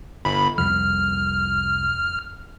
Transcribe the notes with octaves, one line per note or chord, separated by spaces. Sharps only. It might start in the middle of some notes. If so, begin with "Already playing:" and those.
G1 B5
C2 F2 F3 G3 F6